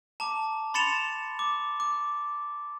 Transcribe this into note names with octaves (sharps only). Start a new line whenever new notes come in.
A5 A#5 D6
B5 C6 A6 C#7 E7 F7
D6
D6